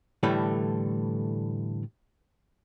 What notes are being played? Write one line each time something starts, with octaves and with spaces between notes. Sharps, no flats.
A2 D3 E3 G3 A3